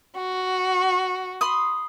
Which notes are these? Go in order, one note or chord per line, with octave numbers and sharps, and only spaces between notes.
F#4
B5 C6 D#6